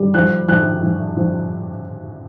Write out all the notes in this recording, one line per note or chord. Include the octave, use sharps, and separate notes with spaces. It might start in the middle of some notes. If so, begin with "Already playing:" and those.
Already playing: G3
F3 F#6
F3 F#6
F3
F3